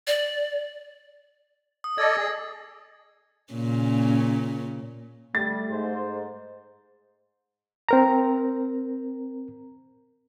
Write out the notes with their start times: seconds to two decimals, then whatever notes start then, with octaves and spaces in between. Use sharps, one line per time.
0.07 D5
1.84 D#6
1.98 A4 D5 D#5 G#6 A#6
2.16 G#4
3.53 A#2 C#3 C#4
5.35 D3 G3 A3 A6
5.71 G#2 C5
7.89 C4 A#4 A#5